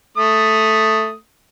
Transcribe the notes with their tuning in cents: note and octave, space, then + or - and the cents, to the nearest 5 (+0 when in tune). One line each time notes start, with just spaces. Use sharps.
A3 +0 D#6 +0